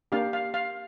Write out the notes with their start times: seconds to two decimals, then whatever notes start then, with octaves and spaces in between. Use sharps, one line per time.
0.12 A#3 D4 G4 F5
0.33 F5
0.54 F5